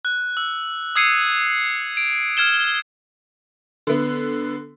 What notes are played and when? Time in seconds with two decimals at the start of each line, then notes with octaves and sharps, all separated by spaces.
0.05 F#6
0.37 E6
0.96 D#6 E6 G#6 C7 C#7 D#7
1.97 D7
2.37 F6 G#6 E7 G7
3.87 D3 B3